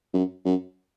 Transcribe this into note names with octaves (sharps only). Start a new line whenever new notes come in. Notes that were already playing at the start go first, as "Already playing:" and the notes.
F#2
F#2